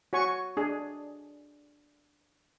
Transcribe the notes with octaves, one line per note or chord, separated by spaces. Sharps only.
F#4 C#5 G#5 C#6
D4 G#4